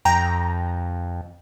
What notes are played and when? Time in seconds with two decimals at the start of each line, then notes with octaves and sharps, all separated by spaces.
0.05 F2 G5 A#5